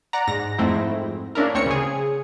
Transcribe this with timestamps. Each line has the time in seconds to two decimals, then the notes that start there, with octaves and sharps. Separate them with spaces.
0.13 D5 F#5 A#5
0.27 G#2 A#6
0.58 F2 G#2 A3 C4 E4
1.35 A#3 C#4 D4 E4 A#4
1.54 D2 C4 C#5 C#7
1.66 C#3 G#4